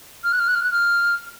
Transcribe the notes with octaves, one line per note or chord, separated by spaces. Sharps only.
F6
F#6
F6
F#6
F6
F#6
F6